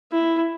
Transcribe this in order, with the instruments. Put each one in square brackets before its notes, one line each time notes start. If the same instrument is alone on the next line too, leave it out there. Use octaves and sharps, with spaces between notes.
[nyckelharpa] E4